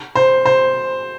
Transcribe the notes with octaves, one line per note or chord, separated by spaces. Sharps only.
C5
C5